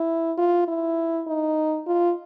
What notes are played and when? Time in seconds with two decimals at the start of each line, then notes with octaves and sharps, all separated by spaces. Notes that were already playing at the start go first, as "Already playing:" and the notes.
Already playing: E4
0.38 F4
0.68 E4
1.27 D#4
1.87 F4